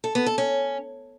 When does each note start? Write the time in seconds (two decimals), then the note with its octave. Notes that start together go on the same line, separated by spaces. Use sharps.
0.04 A4
0.15 B3
0.26 A4
0.38 C#4